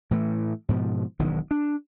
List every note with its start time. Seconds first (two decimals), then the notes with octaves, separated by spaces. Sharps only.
0.11 A2 E3 A3
0.69 G#2 B2 F3
1.19 E1 B1 G#2 D#3
1.51 D4